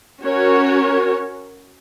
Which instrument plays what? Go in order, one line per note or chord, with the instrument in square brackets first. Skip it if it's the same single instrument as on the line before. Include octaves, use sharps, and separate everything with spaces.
[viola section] C#4 F#4 A#4 C#5